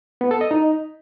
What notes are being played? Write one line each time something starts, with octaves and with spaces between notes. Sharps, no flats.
B3
A4
D#5
D#4